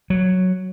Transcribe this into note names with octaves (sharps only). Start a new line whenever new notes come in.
F#3